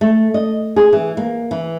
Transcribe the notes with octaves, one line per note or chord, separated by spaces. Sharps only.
A3
D#5
G#4
E3
A#3
E3